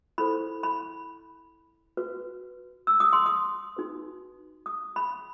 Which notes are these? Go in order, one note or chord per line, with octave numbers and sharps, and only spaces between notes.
E4 A4 C5 B5
B5
F#4 B4
E6
D#6
C6
D#6
D#4 F#4 B4
D#6
B5